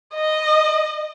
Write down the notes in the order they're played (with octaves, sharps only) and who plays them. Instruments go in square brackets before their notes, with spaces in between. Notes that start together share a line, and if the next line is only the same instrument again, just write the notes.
[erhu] D#5